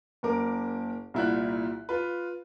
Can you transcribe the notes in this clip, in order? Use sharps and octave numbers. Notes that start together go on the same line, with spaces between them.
F#1 A#3 A#4 D6
C2 A#2 E4 F4 F#6
F4 B4